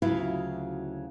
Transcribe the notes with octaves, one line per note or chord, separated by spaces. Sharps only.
D2 C#3 F#3 E4 F4 F5